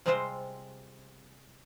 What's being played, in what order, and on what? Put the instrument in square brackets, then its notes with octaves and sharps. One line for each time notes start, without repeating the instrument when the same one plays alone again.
[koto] C3 G3 G#3 C4 F4 C5